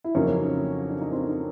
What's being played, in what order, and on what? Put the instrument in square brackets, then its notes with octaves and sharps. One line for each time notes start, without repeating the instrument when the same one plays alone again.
[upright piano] E4
F2 C#3 F#3 A#3 C#4 D#4
D4
D#4
C4 D4
C4